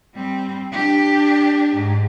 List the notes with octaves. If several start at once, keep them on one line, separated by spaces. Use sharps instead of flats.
G3 C4
D4 G4
G#2